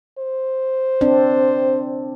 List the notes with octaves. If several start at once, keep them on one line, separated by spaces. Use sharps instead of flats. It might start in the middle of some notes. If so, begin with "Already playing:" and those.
C5
C4 D4